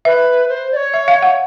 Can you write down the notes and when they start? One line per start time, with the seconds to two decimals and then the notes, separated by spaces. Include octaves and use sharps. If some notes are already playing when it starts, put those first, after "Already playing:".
0.05 B4 E5
0.49 C5
0.72 D5
0.76 C#5
0.94 E5
1.08 F5
1.23 F#5